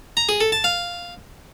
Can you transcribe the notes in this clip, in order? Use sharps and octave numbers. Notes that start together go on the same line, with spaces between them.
A#5
G#4
A4
A5
F5